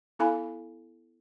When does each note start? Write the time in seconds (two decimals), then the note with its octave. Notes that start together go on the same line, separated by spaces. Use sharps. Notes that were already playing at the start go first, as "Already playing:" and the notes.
0.19 B3 E4 A4 F5 G#5 B5